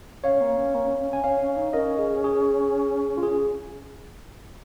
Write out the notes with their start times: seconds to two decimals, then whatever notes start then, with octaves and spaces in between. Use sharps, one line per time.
0.24 C#4 C#5 F5
0.41 A#3
0.57 C#4
0.75 A#3
0.86 C#4
0.98 C#4
1.11 C#4 G#5
1.24 C#4 C#5 F5
1.40 C#4
1.57 D#4
1.73 C#4 A#4 D#5
1.99 G#4
2.24 G#4
3.17 F4
3.23 G#4